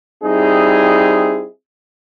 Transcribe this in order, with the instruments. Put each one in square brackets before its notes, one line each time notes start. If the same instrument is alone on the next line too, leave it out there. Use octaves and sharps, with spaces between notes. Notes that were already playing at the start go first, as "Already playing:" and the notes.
[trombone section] G3 C4 D#4 E4 G#4